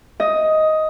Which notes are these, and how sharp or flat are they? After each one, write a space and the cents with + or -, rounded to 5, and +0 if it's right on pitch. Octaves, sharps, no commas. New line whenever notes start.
D#5 +10